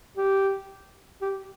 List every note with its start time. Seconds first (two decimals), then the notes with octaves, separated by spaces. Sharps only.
0.17 G4
1.21 G4